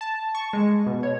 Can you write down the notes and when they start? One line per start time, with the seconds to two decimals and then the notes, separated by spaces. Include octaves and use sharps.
0.01 A5
0.35 C#6
0.53 G#3
0.86 B2
1.03 C#5